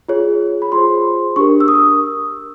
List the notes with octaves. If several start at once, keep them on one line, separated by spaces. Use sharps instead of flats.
F4 G#4 C#5
B5
F4 G#4 C5 C6
D4 G4 A#4 C#6
E6
D#6